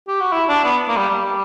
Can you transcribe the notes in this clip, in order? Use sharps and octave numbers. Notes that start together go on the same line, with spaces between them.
G4
F#4
E4
D4
B3
A#3
G3
G3